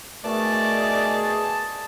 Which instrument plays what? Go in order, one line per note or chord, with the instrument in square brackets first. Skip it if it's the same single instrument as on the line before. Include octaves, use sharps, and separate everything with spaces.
[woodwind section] B2 D#3 A3 [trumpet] G#4 [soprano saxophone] D5 [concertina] A5